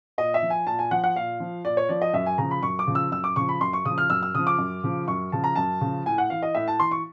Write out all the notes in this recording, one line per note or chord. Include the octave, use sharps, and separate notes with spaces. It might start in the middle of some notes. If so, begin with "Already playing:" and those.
A#2 D#5
E5
F3
G#5
A#2 A5
G#5
F3 F#5
F#5
A#2 F5
F3
A#2 D5
C#5
F3 D5
D#5
F#2 E5
G#5
C#3 F3 A#5
B5
F#2 C#6
D6
C#3 F3
E6
F#2 E6
D6
C#3 F3 C#6
B5
F#2 C6
C#6
C#3 F3 D#6
F6
F#2 E6
E6
C#3 F3 D#6
D6
F#2
C#3 F3
F#2 C#6
C#3 F3 A5
A#5
F#2 A5
C#3 F3
A2 G#5
F#5
E3 F5
D#5
A2 E5
A5
E3 C6
C#6